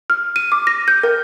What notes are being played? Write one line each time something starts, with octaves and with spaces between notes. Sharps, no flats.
F6
D#7
D6
A#6
G6
A#4